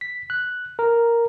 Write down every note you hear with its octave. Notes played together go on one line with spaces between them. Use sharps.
B6
F#6
A#4